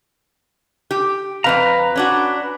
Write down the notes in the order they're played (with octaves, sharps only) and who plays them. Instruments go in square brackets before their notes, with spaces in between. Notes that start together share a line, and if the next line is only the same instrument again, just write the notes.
[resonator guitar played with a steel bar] G4
[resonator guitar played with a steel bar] F2 C4 F5 [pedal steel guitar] B4 A#5
[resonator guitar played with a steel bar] C#4 D4 F#4